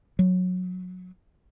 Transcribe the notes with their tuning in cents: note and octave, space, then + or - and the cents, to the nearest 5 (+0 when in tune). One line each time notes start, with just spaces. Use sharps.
F#3 -20